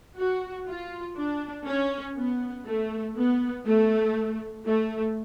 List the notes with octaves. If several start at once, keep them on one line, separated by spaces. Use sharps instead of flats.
F#4
F4
D4
C#4
B3
A3
B3
A3
A3